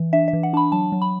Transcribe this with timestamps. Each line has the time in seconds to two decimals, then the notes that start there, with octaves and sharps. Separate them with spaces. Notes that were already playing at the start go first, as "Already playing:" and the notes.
Already playing: E3
0.13 D4 E5
0.28 E5
0.33 E3
0.43 F#5
0.53 D4 A5
0.57 B5
0.72 F#3 A5
0.92 F#3
1.02 B5